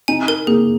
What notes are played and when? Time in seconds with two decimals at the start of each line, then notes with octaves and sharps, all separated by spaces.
0.08 D#4 G#5
0.28 A#4
0.47 A#3 G#4